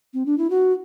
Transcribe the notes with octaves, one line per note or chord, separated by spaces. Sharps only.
C4
D4
E4
F#4